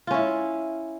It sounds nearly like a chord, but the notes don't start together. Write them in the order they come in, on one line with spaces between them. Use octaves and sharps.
F4 C#4 E4